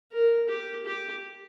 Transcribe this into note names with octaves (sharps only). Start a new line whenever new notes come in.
A#4
G4
G4